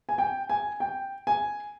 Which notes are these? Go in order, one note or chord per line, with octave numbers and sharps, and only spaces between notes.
G#5
G5
G#5
G5
G#5